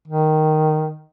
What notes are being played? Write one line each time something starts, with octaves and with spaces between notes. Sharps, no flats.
D#3